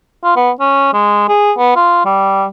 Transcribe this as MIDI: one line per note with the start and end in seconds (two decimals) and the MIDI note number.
0.24 0.35 65
0.36 0.51 59
0.60 0.91 61
0.93 1.25 56
1.28 1.52 68
1.58 1.72 59
1.76 2.01 65
2.05 2.45 55